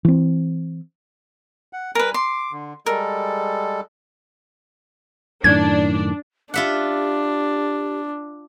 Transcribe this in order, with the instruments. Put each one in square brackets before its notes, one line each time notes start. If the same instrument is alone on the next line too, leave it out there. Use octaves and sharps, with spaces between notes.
[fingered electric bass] E3 C4
[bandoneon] F#5
[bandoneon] G3 G#5 [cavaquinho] A#4 B4
[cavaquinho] C6 [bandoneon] D6
[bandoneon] D3
[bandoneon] G3 G#3 A4 [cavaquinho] A#4
[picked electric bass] F#2 A2 D#3 [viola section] D4 [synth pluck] G#6
[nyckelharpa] D4 [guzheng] F4 E5 F#5 [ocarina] G4